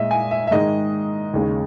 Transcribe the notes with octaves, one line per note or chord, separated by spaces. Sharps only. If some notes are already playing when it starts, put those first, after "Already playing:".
Already playing: A#2 G#3 D#5 E5
G#5
E5
E5
G#2 D#3 G#3 D#5
D#2 C#3 G#3